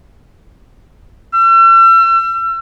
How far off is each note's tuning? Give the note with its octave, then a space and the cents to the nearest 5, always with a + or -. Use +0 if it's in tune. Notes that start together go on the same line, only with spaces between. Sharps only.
E6 +40